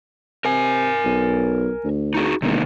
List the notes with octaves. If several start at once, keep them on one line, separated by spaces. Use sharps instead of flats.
C3 A#4 G#5
B1
D2
D#4 F#4 G#4
E1 C3 D#3 A#3